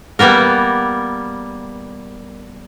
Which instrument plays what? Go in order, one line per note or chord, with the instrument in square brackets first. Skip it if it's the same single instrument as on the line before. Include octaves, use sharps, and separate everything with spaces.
[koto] G3 A#3 B3 A#4